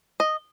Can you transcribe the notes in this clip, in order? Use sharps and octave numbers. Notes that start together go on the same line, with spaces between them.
D#5